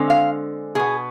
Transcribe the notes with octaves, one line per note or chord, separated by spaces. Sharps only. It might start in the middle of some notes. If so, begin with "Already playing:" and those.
Already playing: D3 G#3 C4
F5
B2 B3 G#4